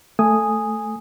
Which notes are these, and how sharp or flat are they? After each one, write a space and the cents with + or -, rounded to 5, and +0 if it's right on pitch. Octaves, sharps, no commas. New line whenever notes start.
A3 +0 G#5 -5 D#6 +0